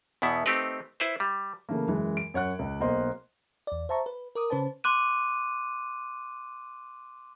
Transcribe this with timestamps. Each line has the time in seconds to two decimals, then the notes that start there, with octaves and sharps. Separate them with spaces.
0.22 E2 B2 B3 E4
0.46 A3 C4 D#4 G4 B4
1.00 E4 B4 C5
1.20 G3
1.69 C#3 E3 A3 A#3
1.87 F#2 E3 G#3
2.17 D7
2.34 F#2 C#5 F#5 F#6
2.59 C#2
2.80 B1 A#3 A#4 C5 D#5 C6
3.67 E2 D5
3.89 C5 E5 A5 A#5 C#6
4.06 B4
4.35 A#4 D6 D#6
4.50 C#3 C#4 B4 C5 A5
4.84 C6 D6 F#6 D#7